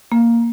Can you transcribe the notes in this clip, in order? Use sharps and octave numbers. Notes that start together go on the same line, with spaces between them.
A#3